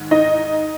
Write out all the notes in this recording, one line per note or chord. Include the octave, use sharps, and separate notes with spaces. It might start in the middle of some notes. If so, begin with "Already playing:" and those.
Already playing: G#2 D#3
D#4 D#5